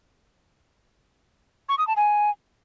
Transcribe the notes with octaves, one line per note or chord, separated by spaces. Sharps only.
C#6
D#6
A5
G#5